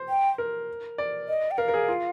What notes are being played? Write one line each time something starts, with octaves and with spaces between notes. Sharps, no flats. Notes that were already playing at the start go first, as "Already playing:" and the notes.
Already playing: C5
G5
A#4
D5
D#5
G5
A#4 F5
A#4
G#4
F4